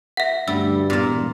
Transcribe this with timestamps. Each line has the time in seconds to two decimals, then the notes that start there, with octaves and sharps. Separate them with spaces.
0.17 E5 F#5
0.48 D2 G2 G3 E6
0.90 E1 A#2 A#3